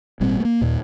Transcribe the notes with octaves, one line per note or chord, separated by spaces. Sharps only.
G#1 A#2 G3 C4
A3 A#3
D#2 A#2